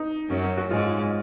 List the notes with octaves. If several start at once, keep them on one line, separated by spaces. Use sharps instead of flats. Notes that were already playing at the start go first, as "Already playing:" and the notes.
Already playing: D#4
F#2 F#3 C#4
C#4
F#4
G#2 G#3 F4